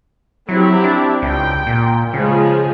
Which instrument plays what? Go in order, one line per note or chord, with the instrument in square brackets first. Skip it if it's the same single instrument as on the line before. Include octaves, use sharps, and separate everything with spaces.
[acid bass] F#3 [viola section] C4 E4 G4
[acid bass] D4
[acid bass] C#2 [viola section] G5
[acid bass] A#2
[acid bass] C#3 [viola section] F3 G#3 G#4